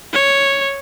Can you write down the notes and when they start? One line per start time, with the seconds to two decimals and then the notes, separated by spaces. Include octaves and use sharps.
0.13 C#5